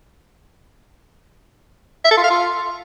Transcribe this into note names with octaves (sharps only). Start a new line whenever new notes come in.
E5
A4
F4
F5
F4